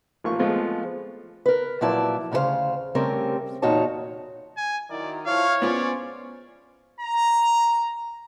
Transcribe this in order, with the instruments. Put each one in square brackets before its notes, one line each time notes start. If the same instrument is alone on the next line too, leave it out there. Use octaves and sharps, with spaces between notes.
[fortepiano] A1 F3 A#3 C#6
F3 G#3 A3 B3 C4 F4
[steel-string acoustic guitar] A#4 B4
A#2 F3 F#3 E4 D5 A5
D2 C#3 F4 A4 C5 F5
C#3 G3 A3 C4 C#4 A#4
E2 A#2 D#4 F#4 C#5 A5
[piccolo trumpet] G#5
[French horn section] D#3 F#3 E4 [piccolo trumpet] D5
[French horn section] F3 E4 [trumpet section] C#5 [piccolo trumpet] F5
[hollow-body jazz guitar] B3 F4 G#4 [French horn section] C#4 C5 [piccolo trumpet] D5
[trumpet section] A#5